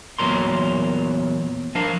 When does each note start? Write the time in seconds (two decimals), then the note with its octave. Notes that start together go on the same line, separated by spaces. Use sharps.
0.19 E2 A#2 F#3 A#4 C6
1.75 F3 D4 A#4 F5